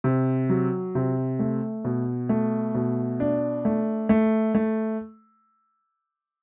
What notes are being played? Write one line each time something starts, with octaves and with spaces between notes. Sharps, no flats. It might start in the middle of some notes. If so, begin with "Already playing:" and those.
C3
F#3
C3
A3
B2
A3
B2
D4
A3
A3
A3